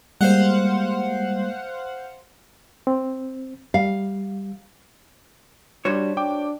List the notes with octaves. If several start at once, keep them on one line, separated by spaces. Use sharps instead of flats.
G3 G#3 A#3 C5 F5 F#5
C4
G3 F5
G3 D4 F#4 C5 C#5
D4 G5 D6